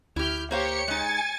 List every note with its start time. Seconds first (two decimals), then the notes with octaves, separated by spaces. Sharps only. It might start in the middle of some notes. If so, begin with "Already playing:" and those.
0.16 D2 E4 G4 F6 G6
0.51 A#3 G4 C5 C#5 F5 C#7
0.88 G#3 D#4 G#5 A6